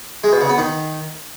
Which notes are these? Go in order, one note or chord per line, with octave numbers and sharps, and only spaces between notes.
G#3
B2
C#3
B3
D#3